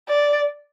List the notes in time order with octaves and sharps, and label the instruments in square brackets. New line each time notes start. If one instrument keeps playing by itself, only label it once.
[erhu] D5